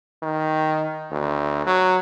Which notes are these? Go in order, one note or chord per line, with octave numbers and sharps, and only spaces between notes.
D#3
D2
F#3